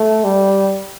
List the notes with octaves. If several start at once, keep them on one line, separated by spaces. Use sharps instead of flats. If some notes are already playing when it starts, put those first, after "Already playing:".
Already playing: A3
G3